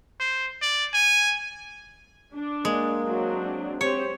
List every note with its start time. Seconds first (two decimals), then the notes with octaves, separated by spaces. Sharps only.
0.20 C5
0.62 D5
0.94 G#5
2.33 D4
2.65 G#3 A#3
3.02 F#3 C4 D4
3.81 C4 G4 C5 C#5